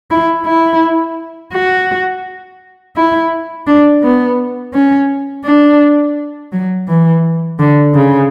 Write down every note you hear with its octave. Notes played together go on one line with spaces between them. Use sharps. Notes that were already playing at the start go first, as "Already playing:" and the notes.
E4
E4
F#4
E4
D4
B3
C#4
D4
F#3
E3
D3
C#3